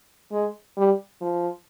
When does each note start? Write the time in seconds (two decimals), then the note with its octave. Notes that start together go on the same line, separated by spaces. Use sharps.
0.32 G#3
0.77 G3
1.21 F3